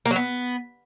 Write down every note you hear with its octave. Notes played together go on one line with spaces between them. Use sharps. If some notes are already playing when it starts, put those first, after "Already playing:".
A#3
F#3
B3